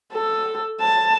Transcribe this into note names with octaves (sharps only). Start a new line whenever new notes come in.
A4
A5